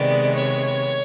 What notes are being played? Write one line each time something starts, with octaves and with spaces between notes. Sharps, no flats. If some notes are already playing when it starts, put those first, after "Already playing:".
Already playing: C3 D#3 G#3 B3 D5
C#5